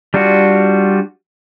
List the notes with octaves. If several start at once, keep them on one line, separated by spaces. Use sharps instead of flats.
G3 D4 F4 F#4